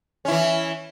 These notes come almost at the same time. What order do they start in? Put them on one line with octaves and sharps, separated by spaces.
C#4 E4 E3